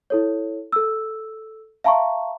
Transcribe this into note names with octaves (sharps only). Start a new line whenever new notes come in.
E4 A4 C#5
A4 E6
E5 F5 A5 A#5 C6 C#6